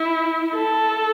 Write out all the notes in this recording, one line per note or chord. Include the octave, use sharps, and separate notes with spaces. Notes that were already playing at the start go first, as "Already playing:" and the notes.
Already playing: E4
A4